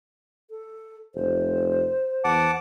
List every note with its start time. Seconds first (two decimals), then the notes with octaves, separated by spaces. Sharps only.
0.50 A4
1.15 F1 C5
2.24 E2 F#5 A5 D6